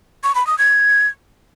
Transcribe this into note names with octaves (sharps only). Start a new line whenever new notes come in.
C#6
B5
D#6
G#6